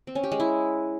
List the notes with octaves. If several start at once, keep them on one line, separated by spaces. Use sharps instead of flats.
C4
C#4
G4
G#3
E4